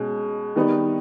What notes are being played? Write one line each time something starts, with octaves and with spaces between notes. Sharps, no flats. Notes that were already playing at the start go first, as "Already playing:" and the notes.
Already playing: B2 G#3 C#4
D#3 G3 B3 D#4